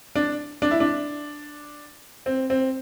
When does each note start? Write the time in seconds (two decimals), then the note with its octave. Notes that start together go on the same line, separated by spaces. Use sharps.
0.15 D4
0.62 D4
0.71 E4
0.80 D4
2.26 C4
2.50 C4